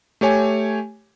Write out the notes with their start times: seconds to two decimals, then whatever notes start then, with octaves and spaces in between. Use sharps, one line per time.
0.21 A3 G4 C#5 G#5